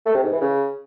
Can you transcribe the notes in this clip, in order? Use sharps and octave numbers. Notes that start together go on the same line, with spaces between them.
A3
C3
G#2
E3
C#3